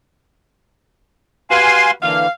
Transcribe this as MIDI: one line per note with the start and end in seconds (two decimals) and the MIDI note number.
1.51 1.90 66
1.51 1.90 67
1.51 1.90 71
1.51 1.91 77
1.51 1.91 80
1.51 1.91 84
2.03 2.27 50
2.03 2.27 52
2.03 2.27 58
2.03 2.29 77